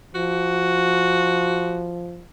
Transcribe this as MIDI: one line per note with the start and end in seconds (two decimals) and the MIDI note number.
0.15 2.26 53
0.15 1.93 66